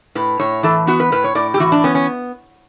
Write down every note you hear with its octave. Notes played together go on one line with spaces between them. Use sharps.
A2 B4
A2 C#5
E3 A4
B3 F#4
B4
A2 B4
C#5
A2 D5
G4
E3 F#4
D4
B3 C#4
C#4